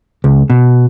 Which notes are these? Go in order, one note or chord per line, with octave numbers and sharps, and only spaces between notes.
C#2
B2